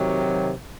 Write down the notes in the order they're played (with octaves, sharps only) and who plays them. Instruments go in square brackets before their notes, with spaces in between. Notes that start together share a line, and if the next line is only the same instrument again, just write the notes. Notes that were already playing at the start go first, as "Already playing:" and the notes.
Already playing: [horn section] C3 D#3 F#3